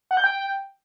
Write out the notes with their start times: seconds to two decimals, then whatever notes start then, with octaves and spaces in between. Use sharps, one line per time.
0.11 F#5
0.17 G6
0.24 G5